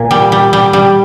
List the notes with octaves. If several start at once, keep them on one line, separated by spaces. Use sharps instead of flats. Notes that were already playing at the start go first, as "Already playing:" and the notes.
Already playing: A#2
G3
G3
G3
G3